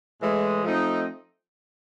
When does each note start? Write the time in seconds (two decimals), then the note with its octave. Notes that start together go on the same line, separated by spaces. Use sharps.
0.21 A2 E3 G#3
0.63 F3 A3 C4 D#4